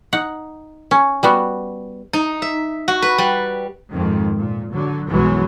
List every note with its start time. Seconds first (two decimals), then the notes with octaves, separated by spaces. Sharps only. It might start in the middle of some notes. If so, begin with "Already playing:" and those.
0.13 D#4 F#5
0.91 C#4
1.23 G3 B3 F#4
2.13 D#4
2.42 E5
2.88 F#4
3.02 B4
3.18 G3
3.93 F2 G#2 D#3
4.37 A#2
4.73 D3 F#3
5.08 B1 F#2 E3 F#3 G#3 B3